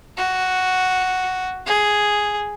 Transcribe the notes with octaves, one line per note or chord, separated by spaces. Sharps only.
F#4
G#4